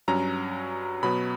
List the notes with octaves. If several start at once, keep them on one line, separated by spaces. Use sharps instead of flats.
G2 F#3 C#4 A#5
B2 F#3 B3 B5